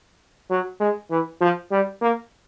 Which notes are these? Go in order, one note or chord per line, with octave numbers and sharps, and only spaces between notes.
F#3
G#3
E3
F3
G3
A#3